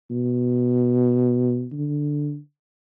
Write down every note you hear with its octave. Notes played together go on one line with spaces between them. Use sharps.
B2
D3